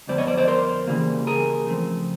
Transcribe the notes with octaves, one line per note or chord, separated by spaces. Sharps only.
F2 D3 G3 B3 C5 D5
C#5 D#5
C5 D5
C5 D5
A#4 C5
C#3 E3 G3 A#3
G#4 A#4
C#3 F3 A3 C4